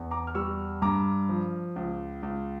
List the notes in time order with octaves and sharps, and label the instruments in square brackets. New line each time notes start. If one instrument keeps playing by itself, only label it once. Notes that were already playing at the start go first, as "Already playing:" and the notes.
Already playing: [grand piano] E2
A#5 D6
F6
G3 C#6 E6
G2 A#5 D6
F3
C#2
C#2